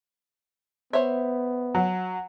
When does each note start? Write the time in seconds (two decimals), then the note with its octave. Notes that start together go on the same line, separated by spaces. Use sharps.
0.93 B3 C5 C#5 E5
1.75 F#3